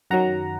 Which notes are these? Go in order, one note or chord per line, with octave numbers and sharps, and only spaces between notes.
F#2 D#3 F#3 F#5 A#5